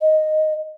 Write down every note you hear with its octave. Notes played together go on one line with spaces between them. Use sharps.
D#5